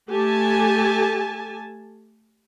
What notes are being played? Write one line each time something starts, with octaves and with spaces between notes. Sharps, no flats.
A3 G4 A4 G#5 A5